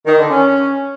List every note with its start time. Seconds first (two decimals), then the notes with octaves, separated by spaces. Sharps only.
0.06 D#3
0.18 D3
0.29 C#4